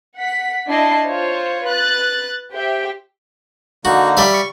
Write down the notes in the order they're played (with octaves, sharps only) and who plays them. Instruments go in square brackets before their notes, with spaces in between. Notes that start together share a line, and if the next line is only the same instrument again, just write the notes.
[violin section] F#5 B6
D4 E4 D#5 A5 C7
F4 C5 C#5
B4 F#6 A6
G4 C5 E5 G5
[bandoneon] D3 A#3 D#4 [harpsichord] F#4
[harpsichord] G3 E5 F5
[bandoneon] C#6